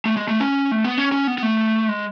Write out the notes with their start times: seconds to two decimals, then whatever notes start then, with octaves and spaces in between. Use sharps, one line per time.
0.05 A3
0.16 G#3
0.28 A3
0.40 C#4
0.72 A3
0.84 B3
0.98 C#4
1.12 C#4
1.27 B3
1.38 B3
1.43 A3
1.89 G#3